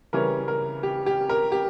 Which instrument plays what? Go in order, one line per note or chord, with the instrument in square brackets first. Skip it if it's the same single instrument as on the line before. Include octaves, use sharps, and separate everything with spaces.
[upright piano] C#3 E3 G3 C#4 A#4
A#4
G4
G4
A#4
G4